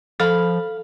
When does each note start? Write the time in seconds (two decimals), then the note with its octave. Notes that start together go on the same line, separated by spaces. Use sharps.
0.20 F3 A4 F5 B5